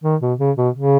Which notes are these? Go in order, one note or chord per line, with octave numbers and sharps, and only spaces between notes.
D#3
B2
C#3
B2
C#3